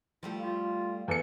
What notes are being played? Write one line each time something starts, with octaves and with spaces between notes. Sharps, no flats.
F3 G3 A3 E4
F4 F5
E2 A4 C#7